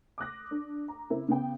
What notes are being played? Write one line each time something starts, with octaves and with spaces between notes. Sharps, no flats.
D6 D#6 F#6 A#6
D4
A#5
C#3 C4 E4 A#4
C#3 B3 G5